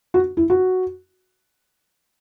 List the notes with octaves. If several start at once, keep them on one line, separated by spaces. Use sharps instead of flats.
F#4
E4
F#4